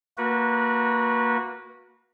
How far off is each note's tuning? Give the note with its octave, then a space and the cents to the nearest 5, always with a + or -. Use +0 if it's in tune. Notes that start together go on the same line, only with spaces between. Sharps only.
A#3 -10 F#4 -15 B4 -30